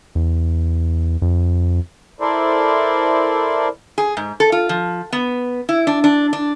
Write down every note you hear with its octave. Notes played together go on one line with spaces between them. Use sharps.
E2
F2
E4 A4 A#4 C5 D5
G#4
G#2
A4
F4
F3
B3
E4
D4
D4
D4